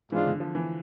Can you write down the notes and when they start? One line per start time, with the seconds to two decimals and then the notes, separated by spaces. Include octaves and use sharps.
0.11 G#2 E3 G#3 D4 F4
0.27 D3
0.40 F3
0.55 E3